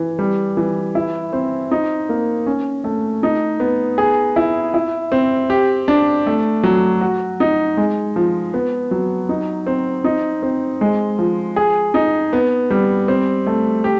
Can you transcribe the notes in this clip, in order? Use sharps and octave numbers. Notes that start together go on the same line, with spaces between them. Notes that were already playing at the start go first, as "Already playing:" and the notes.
Already playing: E3
G3
E3
E4
C4
D#4
A#3
C#4
A3
D#4
B3
G#4
E4
E4
C4
G4
D4
A3
F#3
F#4
D#4
G#3
F3
B3
F#3
D#4
C4
D#4
C4
G#3
F3
G#4
D#4
B3
G3
C4
A3
G4